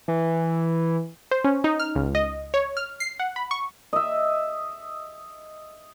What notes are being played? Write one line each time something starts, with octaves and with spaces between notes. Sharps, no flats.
E3
C5
C#4
D#4
F6
C#2
D#5
C#5
F6
C7
F#5
B5
C#6
D#5 E5